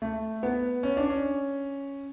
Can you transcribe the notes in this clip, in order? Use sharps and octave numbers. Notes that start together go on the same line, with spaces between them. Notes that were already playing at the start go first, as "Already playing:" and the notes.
A3
B3
C#4
D4
C#4